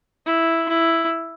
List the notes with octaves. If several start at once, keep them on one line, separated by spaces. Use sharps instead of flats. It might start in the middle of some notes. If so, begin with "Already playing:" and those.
E4
E4